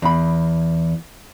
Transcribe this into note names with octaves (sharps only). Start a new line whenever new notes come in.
E2 B5